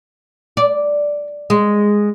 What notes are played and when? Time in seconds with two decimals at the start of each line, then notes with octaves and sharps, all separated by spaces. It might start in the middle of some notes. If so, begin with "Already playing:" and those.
0.57 D5
1.50 G#3